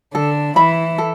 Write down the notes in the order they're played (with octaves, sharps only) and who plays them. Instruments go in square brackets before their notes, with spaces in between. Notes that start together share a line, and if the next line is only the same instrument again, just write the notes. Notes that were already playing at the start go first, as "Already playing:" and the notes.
[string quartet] D3 D4 [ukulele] A4
[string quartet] E3 E4 [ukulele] E5 B5
[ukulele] A4